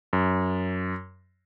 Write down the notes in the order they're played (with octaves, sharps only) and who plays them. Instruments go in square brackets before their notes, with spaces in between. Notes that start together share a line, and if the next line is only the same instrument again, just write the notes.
[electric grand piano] F#2